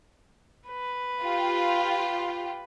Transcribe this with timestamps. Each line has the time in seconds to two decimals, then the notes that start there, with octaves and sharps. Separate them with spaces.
0.68 B4
1.21 F4 G4